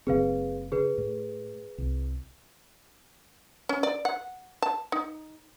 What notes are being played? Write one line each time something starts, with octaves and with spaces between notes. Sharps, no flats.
F#1 C#3 C4 G#4 B4 F5
C#3 G#4 B4
A2
C2
C#4
D5
F#5
A5
D#4